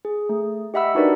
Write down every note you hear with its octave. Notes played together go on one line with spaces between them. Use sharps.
G#4
A3
G4 D#5 E5 F#5 B5 E6
D4 D#4 F#4 A#4 B4 D5